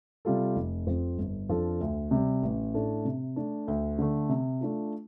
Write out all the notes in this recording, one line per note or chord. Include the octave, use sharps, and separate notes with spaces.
C3 G3 F4 A4
F1
F2 F3 C4
G1
F2 F3 D4 A4
D2
C3 G3
A1
A2 A3 D4 A4
C3
A3 D4
D2
D3 A3
C3
A3 D4 F4